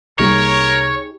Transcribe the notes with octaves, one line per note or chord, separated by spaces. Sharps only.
C2 G3 A#3 D#4 G4 G#4 A#4 C#5